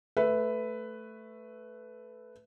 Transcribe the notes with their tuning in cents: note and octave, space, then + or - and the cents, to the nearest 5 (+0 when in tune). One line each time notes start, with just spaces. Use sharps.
A3 +0 B4 +10 E5 +0